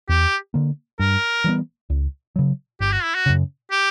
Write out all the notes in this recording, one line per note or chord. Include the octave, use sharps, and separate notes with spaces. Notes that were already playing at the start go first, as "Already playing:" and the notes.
E2 G4
D3 A#3
G2 A#4
E3 G3 B3
C#2
C#3 F#3
G1 G4
F#4
E4
F#4
F#2 C#3
G4